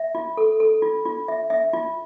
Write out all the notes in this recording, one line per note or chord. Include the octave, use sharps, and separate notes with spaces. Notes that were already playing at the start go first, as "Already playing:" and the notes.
Already playing: E5
F4
A4
A4
F4
F4
E5
E5
F4